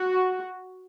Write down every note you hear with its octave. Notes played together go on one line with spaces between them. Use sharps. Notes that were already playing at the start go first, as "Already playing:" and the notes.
Already playing: F#4